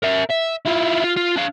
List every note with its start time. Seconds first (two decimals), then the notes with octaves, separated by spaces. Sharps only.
0.03 A#4 E5
0.30 E5
0.65 E4 F4
1.04 F4
1.17 F4
1.36 D4 F5